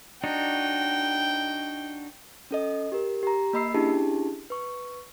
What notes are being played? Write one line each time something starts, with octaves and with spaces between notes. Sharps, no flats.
D4 D#4 F#4 G5
C#4 A4 D#5
G4 A#4
G4 A#5
A#3 D#5 B5 E6 C7
C#4 D4 E4 G4 G#4 A5
B4 C#6